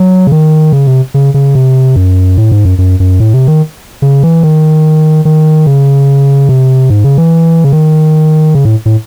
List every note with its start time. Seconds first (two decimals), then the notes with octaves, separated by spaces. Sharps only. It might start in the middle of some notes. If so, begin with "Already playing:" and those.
Already playing: F#3
0.27 C#3
0.32 D#3
0.73 C#3
0.87 C3
1.14 C#3
1.34 C#3
1.55 C3
1.96 F#2
2.37 A2
2.52 G#2
2.65 F#2
2.78 F#2
3.00 F#2
3.20 A2
3.34 C3
3.48 D#3
4.02 C#3
4.23 E3
4.43 D#3
5.25 D#3
5.66 C#3
6.49 C3
6.90 G#2
7.04 C#3
7.18 E3
7.64 C#3
7.72 D#3
8.55 C#3
8.65 A2
8.86 A2